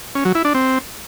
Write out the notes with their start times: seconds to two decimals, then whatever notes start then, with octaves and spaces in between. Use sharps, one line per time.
0.15 C#4
0.25 F#3
0.35 E4
0.45 D4
0.55 C4